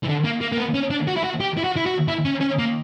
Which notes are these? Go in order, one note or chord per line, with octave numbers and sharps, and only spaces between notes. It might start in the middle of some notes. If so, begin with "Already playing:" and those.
E3
D3
A#3
A#3
A#3
B3
C#4
D4
F#4
E4
F#4
G4
E4
F#4
E4
F#4
E4
C#4
C#4
A#3